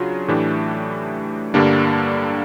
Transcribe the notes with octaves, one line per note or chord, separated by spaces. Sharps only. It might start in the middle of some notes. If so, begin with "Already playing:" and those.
Already playing: C#3 F#3 D4 F4
A2 E3 A3 D4 G4
G2 D3 G3 A#3 D4